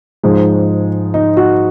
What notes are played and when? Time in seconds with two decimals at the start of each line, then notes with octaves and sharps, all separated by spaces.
0.23 G#2 F3 G#3 D#4
1.14 D#4
1.37 F#4